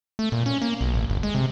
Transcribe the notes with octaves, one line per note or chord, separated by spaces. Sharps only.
A3
A#2
C#4
A#3
B1
A1
G1
G#3
C3